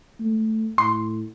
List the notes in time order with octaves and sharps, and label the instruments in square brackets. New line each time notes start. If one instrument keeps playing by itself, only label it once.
[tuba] A3
[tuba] A2 [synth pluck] C6